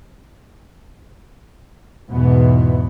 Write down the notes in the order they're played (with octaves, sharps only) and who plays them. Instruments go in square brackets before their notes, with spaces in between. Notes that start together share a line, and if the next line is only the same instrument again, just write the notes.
[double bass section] E2 G#2 B2 E3 B3